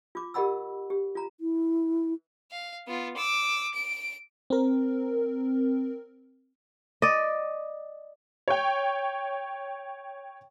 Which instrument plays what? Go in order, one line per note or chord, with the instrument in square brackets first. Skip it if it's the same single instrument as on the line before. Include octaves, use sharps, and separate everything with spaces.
[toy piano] F4 D6
G4 A#4 D#5 F#5 B5 E6
G4
F4 A#5
[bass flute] E4
[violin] F5
B3 F4
D6 E6
D7
[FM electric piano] C4 A#4
[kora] D5 D#5
[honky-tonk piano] C#5 G5